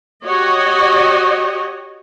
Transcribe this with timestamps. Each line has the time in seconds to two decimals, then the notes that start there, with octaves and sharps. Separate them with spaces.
0.25 F#4 G4 C#5 D#5